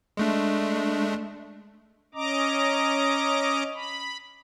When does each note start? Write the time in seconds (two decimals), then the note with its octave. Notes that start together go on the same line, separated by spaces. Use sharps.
0.17 G#3 A3 D4
2.15 C#4 D#5 A#5 D6
3.75 B5